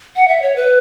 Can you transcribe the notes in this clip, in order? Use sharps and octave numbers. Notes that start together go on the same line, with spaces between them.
F#5
E5
C#5
B4